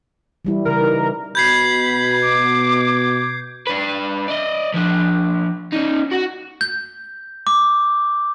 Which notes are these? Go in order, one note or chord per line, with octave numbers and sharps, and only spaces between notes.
E3 G3 E4
C#3 E3 A#4
D#4
B2 B5 G6 G#6 C7
D6
D4 B4
D5 D#5
F3 D4
C#4 D#4
F#4 F#5
G6
D6